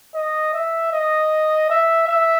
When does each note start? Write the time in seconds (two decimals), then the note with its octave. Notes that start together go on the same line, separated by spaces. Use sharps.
0.14 D#5
0.53 E5
0.92 D#5
1.70 E5
2.08 E5